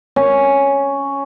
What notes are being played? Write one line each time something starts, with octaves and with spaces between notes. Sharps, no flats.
C#4